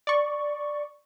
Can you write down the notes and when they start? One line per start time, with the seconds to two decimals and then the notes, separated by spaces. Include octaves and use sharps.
0.07 D5 C#6